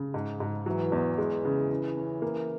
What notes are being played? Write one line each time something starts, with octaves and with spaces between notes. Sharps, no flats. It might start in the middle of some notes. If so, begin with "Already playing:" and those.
Already playing: C#3
G#2
G#2
E3 F#3
E2
E3 G#3
C#3
C#3
C#4
A#3